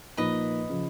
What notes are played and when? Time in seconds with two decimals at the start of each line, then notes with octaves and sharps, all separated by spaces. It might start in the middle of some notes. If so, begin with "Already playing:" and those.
0.17 A#2 F3 A#3 D#4 B4 D#5
0.69 C#3 F3